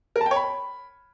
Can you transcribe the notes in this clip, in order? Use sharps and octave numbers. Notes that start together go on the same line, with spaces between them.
A#4
A5
G5
C#5
B5